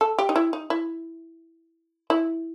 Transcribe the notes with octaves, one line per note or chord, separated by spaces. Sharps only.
A4
G4
D#4
E4
D#4
E4
E4